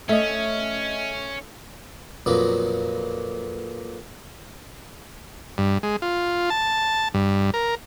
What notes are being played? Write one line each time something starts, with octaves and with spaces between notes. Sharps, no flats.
A3 C#4 D#5 E5
F2 A#2 F#3 A#3 B3
G2
G#3
F4
A5
G2
A#4